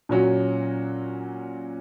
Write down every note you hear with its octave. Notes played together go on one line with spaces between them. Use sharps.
A#2 F#3 C#4 F#4